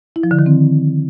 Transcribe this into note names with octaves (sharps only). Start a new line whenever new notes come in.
E4
F3
D3
D#3
C4